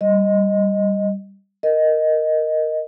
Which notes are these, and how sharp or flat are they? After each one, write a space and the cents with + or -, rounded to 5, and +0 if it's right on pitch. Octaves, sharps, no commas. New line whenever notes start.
G3 +0 D#5 +0
A#4 +0 D#5 +0